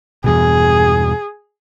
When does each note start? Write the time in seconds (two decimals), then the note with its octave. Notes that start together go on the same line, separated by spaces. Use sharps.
0.24 E2 G2 B2 G#4